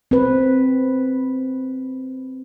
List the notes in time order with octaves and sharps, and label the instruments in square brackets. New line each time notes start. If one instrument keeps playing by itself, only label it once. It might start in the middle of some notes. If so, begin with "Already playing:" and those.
[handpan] C4 B4